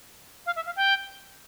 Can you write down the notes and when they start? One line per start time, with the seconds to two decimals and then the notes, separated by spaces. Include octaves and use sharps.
0.46 F5
0.56 E5
0.66 F5
0.76 G5